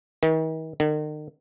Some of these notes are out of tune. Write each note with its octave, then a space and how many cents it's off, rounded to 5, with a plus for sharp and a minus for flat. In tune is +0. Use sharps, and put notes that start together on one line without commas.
D#3 +45
D#3 -40